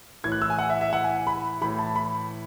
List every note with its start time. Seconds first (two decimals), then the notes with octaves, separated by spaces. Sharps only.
0.24 A2 E3 G#6
0.32 F#6
0.42 E6
0.50 G#5
0.59 F#5
0.70 E5
0.81 E5
0.93 F#5
1.04 G#5
1.27 B5
1.61 A2 E3 B5
1.78 A5
1.96 B5